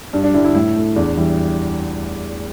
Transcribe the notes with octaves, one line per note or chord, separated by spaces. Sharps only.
G2 D4
D4
D3 G3 E4
E4
A2 E4
A3
E2 D4
E3 G3 E4